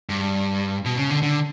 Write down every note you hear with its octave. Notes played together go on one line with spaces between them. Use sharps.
G2
B2
C#3
D3
D3